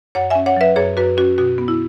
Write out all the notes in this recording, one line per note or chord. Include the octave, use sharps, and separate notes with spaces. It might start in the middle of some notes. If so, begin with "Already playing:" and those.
F#2 C#5 F#5
C#4 E5 G#5
C#5 F#5
F#3 B4 E5
F#2 G#4 C#5
F#2 F#4 B4
C#4 F#4
B2 F#4
B3
E4